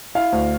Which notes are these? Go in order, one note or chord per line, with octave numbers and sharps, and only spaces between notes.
E4 F5
D2